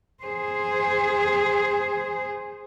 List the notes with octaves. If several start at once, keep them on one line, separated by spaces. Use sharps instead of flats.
G#4 C5